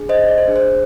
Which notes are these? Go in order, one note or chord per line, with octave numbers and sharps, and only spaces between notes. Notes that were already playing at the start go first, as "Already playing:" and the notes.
Already playing: D4 G#4
C5 D#5
D5
C5
D4 G#4
C5